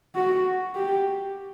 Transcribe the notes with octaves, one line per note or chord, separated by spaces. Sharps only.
F#4
G4